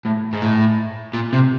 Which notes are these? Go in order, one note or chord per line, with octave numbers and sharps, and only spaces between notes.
A2
G#2
A2
A#2
C3